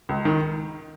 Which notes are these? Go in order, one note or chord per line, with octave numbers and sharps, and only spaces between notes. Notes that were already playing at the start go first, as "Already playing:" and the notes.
C#2
D#3